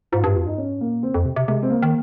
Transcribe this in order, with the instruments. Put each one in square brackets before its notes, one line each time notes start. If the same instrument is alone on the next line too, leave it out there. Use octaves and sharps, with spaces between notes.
[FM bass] G#2 [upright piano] F4
[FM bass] G2 [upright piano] G4
[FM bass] F2 [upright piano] F4
[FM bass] G2 [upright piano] D#4
[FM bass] G#2 [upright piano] C#4
[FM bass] A#2 [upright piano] A#3
[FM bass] C#3 [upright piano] C4
[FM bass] F2
C3
C3
[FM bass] C3 [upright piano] G#3
[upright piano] C4
[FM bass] C#3 [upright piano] A#3
[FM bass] D#3